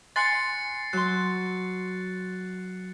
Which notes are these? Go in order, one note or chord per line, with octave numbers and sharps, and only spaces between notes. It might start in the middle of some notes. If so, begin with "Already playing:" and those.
G#5 C6 F#6 A6 C7 C#7
F#3 C6 F#6